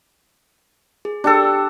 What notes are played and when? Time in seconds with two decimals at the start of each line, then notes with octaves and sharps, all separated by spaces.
1.05 G#4
1.24 D4 G4 A4 G5 E6